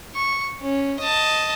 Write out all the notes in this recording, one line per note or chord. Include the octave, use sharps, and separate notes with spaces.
C#6
C#4
D#5 A5